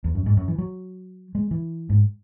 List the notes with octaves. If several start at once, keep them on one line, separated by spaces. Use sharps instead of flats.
E2
F#2
G#2
F#2
E3
F#3
G#3
E3
G#2